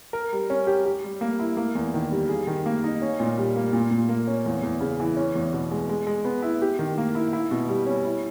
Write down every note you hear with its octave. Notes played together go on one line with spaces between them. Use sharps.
A#4
G3
C#4
G4
G4
G3
A#3
E4
A#3
E2
D#3
G3
G#4
D#3
A#3
D#4
C#4
A#2
G3
A#3
A#2
A#2
A#3
C#4
E2
E2
C#3
E3
C#4
E2
B2
G#3
G#3
G#3
B3
E4
G4
D#3
A#3
E4
E4
B2
G3
C#4
E4